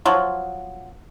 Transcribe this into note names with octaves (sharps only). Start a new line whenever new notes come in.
F3 F#3